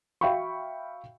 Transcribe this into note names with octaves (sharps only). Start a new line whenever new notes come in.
F#4 E5 F5 G5 B5 C#6